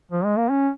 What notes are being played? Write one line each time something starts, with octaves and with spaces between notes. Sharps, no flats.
F3
G#3
A#3
C#4